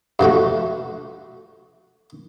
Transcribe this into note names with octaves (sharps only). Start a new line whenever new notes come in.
G2 F3 A3 F#4